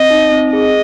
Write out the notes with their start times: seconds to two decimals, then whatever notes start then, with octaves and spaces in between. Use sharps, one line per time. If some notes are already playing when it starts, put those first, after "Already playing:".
Already playing: C4 D#5
0.10 D#4
0.32 C4
0.53 G#4 D#5